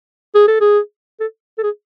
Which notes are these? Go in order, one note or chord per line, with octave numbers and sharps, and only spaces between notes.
G#4
A4
G#4
A4
A4
G#4